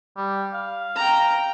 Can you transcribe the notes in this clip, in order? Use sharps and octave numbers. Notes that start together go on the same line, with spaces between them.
G3
F5
G5 A#5